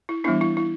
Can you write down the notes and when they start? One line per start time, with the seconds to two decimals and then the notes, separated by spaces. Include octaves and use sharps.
0.09 E4
0.24 E3 G3 B3 D4 E4
0.41 E4
0.57 E4